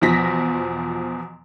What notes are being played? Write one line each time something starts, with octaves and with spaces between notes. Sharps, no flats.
E2 B2 F3 A#6 B6